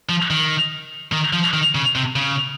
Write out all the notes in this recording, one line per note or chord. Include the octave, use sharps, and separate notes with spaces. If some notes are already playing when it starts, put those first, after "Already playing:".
F3
D#3
D#3
F3
D#3
C#3
C3
C#3